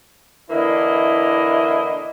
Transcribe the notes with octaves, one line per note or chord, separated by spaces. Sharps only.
D3 E3 A#3 E4 D#5